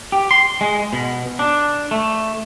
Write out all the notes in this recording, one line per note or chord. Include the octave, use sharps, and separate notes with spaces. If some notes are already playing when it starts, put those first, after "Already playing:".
G4
C6
G#3
B2
D4
A3